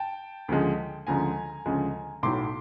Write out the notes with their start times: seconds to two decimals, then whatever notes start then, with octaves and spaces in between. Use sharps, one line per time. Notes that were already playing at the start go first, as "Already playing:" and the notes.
Already playing: G5 A5
0.49 D2 C#3 F3 G#3
1.07 D2 C#3 F3 G#3 G#5 A#5
1.65 D2 C#3 F3 G#3
2.23 B1 A2 F#3 C6 D6